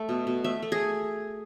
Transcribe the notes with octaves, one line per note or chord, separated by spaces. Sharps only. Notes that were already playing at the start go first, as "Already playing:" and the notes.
Already playing: A3
B2
B2
A3 E5
A3
G#4